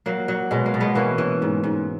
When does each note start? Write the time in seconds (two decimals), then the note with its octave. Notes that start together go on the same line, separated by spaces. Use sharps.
0.06 F#3 A#3
0.28 F#3
0.51 B2 G#3
0.66 A#3
0.74 B2
0.80 G#3 B3
0.95 E3 A#3 C#4
1.18 E3
1.42 G#2
1.64 G#2